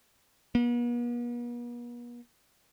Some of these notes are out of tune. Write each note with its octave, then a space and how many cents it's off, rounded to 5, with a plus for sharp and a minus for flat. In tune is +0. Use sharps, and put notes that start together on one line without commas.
B3 -45